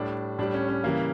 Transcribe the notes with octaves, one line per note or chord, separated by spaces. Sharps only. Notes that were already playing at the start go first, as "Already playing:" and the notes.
Already playing: A2 G3 D4
A2 G3 D4
C#4
C#4
C#3 E3 G3 A#3